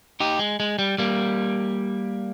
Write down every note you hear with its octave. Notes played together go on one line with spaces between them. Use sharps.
D#4 G4
G#3
G#3
G3
G3 A#3